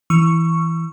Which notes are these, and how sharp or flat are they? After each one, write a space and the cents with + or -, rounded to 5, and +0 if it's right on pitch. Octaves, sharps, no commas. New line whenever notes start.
E3 +0 C#6 +0 E6 +30